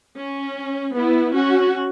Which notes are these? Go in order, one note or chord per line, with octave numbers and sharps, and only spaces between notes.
C#4
B3 E4
C#4 F#4